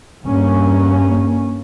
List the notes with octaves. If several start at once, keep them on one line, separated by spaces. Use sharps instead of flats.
G2 A#3 C#4